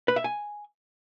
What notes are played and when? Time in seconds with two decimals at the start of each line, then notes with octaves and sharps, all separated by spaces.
0.08 B4
0.16 E5
0.24 G#5